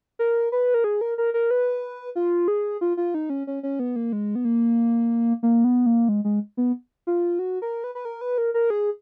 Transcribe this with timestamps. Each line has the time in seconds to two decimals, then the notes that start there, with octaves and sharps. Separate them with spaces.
0.19 A#4
0.52 B4
0.74 A#4
0.84 G#4
1.01 A#4
1.18 A#4
1.34 A#4
1.51 B4
2.16 F4
2.48 G#4
2.81 F4
2.97 F4
3.14 D#4
3.30 C#4
3.47 C#4
3.63 C#4
3.79 B3
3.96 A#3
4.13 G#3
4.35 B3
4.45 A#3
5.43 A#3
5.64 B3
5.86 A#3
6.09 G#3
6.25 G#3
6.57 B3
7.07 F4
7.39 F#4
7.62 A#4
7.84 B4
7.95 B4
8.05 A#4
8.21 B4
8.38 A#4
8.54 A#4
8.70 G#4